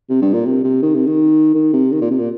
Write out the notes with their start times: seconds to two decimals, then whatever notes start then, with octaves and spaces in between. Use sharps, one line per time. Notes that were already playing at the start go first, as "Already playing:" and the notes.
0.10 C3
0.22 G2
0.33 A#2
0.46 C3
0.64 C3
0.82 D#3
0.94 C3
1.07 D#3
1.55 D#3
1.73 C3
1.92 D#3
2.01 A#2
2.11 C3
2.19 A#2